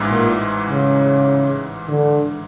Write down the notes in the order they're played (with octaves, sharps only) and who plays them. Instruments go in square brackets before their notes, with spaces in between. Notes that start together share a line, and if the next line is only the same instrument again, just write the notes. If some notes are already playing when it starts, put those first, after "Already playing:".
Already playing: [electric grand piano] A1 G#2 E3 G#3
[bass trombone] A#2
C#3
D3